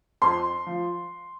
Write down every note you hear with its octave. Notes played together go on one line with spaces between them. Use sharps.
F2 C6
F3